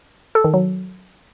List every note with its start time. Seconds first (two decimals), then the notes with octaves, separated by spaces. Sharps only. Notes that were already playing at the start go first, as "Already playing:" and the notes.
0.35 A4
0.44 D#3
0.54 F#3